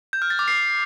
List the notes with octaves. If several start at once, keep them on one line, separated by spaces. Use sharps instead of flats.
G6
F6
A6
D6
C7